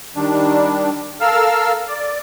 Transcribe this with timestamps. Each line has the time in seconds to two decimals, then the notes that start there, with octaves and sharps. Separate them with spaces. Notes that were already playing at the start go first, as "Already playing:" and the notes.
0.16 D#3 G3 D4
1.21 A4 A#4 F5 E6 F6
1.88 D5